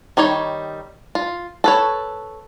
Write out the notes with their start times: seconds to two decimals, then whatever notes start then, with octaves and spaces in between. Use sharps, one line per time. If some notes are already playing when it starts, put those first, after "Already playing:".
0.17 D#3 G3 D#4 C#5
1.15 F4
1.64 A4 B4 C#5